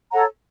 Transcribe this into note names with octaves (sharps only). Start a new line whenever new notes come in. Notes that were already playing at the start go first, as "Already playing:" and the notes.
A4 C#5 F#5 A#5